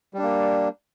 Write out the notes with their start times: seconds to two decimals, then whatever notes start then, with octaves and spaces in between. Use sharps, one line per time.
0.14 G3
0.18 D4
0.23 A#3